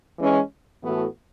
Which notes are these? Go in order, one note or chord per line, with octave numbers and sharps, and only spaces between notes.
E3 G#3 C#4
A2 E3 B3 F#4 A4